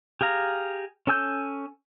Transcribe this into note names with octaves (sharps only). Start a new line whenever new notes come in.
G4 G#4 F5 A#5
C#4 A4 G#5 E6 G6